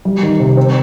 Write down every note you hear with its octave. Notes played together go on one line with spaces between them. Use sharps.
G3
D#3
C3
C4